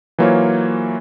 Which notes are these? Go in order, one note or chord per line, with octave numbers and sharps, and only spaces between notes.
E3 F#3 A#3 F4 C5 C#5